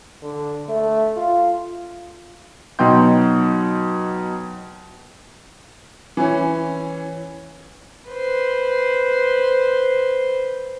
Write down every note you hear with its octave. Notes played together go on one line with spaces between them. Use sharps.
D3
A3
F4
B2 F#3 D#4 G5 C6 G6
E3 C#4
B4 C5